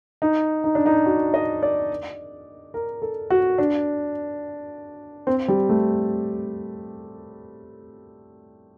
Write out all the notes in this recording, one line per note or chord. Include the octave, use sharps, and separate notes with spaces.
D#4
D#4
D4
D#4
F#4
D#5
D5
A#4
A4
F#4
D4
C4
G3
A3